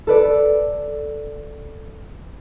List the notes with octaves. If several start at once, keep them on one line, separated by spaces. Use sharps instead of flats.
A4 B4 D5